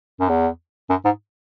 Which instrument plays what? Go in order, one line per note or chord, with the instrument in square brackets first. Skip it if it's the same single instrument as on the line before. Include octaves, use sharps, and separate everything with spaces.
[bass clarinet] F#2
E2
F#2
G#2